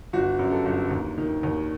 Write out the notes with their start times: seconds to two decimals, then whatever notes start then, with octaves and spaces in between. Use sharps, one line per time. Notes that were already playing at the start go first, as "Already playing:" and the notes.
0.13 G1 F#4
0.39 F#2
0.52 A4
0.66 G1
0.91 D#2
1.18 D#3
1.43 D#2